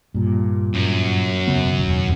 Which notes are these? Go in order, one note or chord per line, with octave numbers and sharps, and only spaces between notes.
G2 A#2
F#2
E1 C#3 B3
E1 D#2